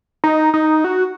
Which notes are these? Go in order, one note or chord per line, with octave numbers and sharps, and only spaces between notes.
D#4
D#4
F#4